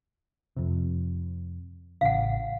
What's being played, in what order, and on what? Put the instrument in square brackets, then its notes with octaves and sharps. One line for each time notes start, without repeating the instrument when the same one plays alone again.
[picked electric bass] F2 C3
[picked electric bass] A1 C#3 [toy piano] F5 F#5